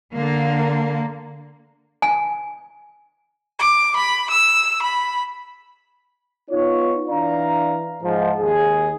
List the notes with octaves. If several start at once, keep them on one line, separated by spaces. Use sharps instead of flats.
D3 A#3
G#5
D6
B5
E6
B5
B3 D#4 F4 C#5
E3 D4 D5 F5 A#5
G#2 F3
D#2 G#4